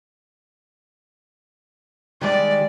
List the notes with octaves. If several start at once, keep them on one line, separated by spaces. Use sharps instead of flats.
D#3 G3 G#3 D5